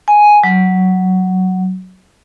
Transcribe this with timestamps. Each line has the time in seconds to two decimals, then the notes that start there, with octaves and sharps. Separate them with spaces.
0.08 G#5
0.44 F#3